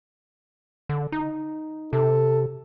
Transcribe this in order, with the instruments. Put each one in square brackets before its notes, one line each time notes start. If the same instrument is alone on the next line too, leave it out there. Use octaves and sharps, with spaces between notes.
[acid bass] D3
D#4
[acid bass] C3 [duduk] A4